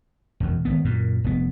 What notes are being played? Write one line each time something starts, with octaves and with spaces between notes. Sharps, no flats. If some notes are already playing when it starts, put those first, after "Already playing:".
E1 F#2
G#1 B3
F#2 A#2
F1 B3